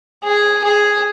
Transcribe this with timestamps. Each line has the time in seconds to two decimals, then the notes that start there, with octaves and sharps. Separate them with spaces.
0.24 G#4
0.64 G#4